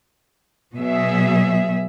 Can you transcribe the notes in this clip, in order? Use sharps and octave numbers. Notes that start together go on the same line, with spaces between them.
B2 F#3 G#4 E5